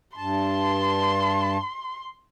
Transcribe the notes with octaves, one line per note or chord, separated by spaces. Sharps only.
G2 A5 C6